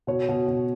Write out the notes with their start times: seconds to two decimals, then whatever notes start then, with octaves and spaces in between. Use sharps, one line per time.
0.07 B2 C#5
0.29 B2
0.48 B2